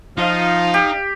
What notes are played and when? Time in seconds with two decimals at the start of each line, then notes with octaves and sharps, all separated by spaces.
0.18 F3 D#4 F4 F5
0.74 G4